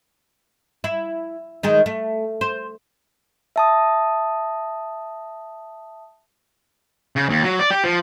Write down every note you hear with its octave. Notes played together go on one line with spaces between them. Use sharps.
E4
D#3 G#3 D#4
A3
C5
E5 A5 D#6
C#3
D#2
F#3
D5
G4
F3